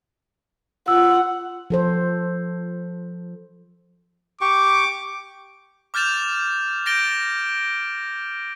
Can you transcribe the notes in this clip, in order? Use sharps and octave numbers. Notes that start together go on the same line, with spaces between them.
F4 F#5 E6
F3 A4 C5
G4 C#6 D6
D6 F6 G6 A6 E7 F7
G6 A6 A#6 D7 G7